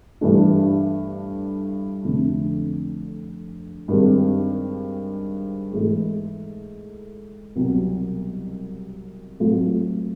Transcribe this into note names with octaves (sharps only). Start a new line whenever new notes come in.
G2 E3 A3 D4
F1 F2 D3
G2 D#3 G#3 C4
G#2 E3 A3
C2 B2 F#3
A2 F#3 A3 C4 F4